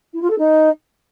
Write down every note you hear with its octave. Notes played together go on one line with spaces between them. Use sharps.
E4
F4
A4
D#4